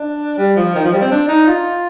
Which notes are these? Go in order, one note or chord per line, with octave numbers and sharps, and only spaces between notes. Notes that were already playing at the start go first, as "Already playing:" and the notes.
Already playing: D4
G3
F3
D#3
F3
G3
C4
D4
D#4
F4